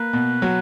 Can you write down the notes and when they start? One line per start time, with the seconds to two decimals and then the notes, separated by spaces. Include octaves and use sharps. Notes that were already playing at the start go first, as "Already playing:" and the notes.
Already playing: A#3 B4
0.13 B2
0.42 F#3